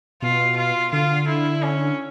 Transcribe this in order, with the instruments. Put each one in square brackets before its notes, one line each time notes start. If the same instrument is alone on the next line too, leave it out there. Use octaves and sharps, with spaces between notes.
[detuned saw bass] B2 [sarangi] F4
[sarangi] F4
[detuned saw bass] D3 [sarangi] F4
[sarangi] E4
C#4